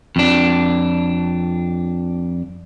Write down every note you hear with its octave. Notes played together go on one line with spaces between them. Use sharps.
F2 D4